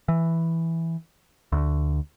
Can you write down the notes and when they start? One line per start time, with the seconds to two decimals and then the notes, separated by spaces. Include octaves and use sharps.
0.08 E3
1.52 D2